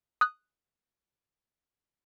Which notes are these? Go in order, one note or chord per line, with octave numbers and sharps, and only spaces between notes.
D#6 F#6